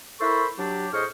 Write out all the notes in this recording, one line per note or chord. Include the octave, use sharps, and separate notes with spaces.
E4 A4 A#4 C5 B5 C#6
F#3 D4 G4
A2 G#4 C5 D#5 C#6 F6